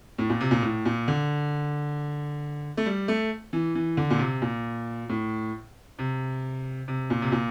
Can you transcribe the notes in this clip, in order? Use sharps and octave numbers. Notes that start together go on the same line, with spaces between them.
A2
A#2
C3
A#2
A2
A#2
D3
A3
G3
A3
E3
E3
D3
A#2
C3
A#2
A2
C3
C3
A#2
C3
A#2